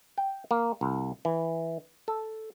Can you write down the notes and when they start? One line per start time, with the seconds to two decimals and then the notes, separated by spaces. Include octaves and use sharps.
0.18 G5
0.51 A#3
0.81 C2
1.25 E3
2.08 A4